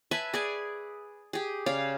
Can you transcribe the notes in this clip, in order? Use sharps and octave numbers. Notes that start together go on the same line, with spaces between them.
B4 E5 G#5 A5
G#4 D5 G#5
G4 G#4
C#3 D5 F5